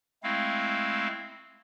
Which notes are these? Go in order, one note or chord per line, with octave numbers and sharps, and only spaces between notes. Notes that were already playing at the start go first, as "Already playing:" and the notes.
G#3 A3 C4 E4 F5